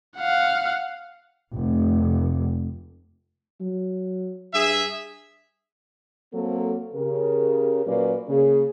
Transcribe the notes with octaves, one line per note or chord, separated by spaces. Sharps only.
F5 F#5
F1
F#3
G2 G#4 E5
F#3 A#3 C4 A4
C#3 G4 A#4
A#2 F#3 A#3 C#4 B4 D5
C#3 A#3 G#4